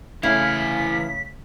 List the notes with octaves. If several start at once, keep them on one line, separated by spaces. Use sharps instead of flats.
C#3 E3 A3 E4 F5 G#5 B6